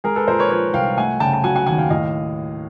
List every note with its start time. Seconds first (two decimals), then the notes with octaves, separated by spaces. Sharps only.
0.04 G#3 G#4 A#4
0.16 A4 B4
0.28 A#2 A#4 C5
0.39 B4 C#5
0.50 F3 B4 C#5
0.74 C2 F5 G5
0.97 A3 F#5 G#5
1.20 C#3 G5 A5
1.33 A5
1.44 F#3 F#5 G#5
1.55 F#5 G#5
1.66 D#2 F#5 G#5
1.78 F5 G5
1.90 A2 D#5 F5